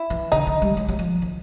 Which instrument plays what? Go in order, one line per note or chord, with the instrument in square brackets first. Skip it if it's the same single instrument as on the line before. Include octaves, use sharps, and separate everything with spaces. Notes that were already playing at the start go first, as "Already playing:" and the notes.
Already playing: [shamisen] E4
[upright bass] E3
[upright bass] D3 [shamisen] D#4
[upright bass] D#3
G3
F#3
F#3
F3
D#3